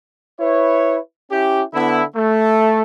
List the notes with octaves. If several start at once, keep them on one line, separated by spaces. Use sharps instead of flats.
E4 B4 C#5
C#4 E4 G4
D3 B3 E4
A3